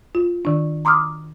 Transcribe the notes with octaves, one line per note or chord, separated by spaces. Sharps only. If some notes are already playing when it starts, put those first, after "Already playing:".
F4
D#3 D4
A#5 C6 D6 D#6 F6